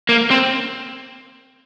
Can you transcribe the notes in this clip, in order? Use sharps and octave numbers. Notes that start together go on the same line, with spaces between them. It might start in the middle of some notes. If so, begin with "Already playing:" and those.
A#3
C4